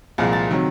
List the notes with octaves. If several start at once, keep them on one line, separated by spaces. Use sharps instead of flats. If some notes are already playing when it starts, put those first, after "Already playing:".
C2 A#2 F3 G#3 A6
A6
C3 D#3 F#3